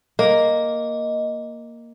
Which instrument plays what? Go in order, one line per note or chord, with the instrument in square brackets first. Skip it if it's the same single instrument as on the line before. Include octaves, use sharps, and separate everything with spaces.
[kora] A#3 [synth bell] D#5